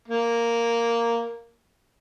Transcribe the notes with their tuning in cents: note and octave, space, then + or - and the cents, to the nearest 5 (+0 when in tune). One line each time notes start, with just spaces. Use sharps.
A#3 -5